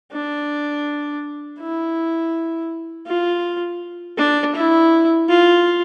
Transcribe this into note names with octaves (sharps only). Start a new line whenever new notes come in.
D4
E4
F4
D4
E4
F4